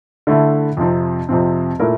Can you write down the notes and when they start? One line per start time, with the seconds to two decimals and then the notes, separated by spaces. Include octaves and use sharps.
0.27 D3 A3 E4
0.77 F2 C3 F3 C4
1.29 F2 C3 F3 C4
1.80 A#2 A3 E4 A#4